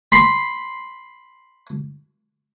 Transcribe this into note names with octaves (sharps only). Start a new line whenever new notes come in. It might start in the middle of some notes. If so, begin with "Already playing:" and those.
B5 C6